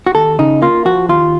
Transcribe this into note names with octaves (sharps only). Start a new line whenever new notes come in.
F#4
D#2 A4
C#3 D#4
A#3 F4
F3 F#4
D#2 F4